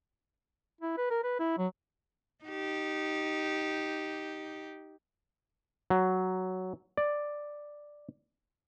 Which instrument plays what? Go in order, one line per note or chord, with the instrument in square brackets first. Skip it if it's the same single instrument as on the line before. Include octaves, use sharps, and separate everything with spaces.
[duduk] E4
B4
A#4
B4
E4
F#3
[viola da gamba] D#4 G4
[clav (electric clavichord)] F#3
D5